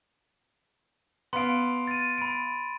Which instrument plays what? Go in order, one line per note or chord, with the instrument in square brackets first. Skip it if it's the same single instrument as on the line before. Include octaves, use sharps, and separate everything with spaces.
[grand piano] B3 F5 [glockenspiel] C6 D7
[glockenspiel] A6 D#7
B5 D7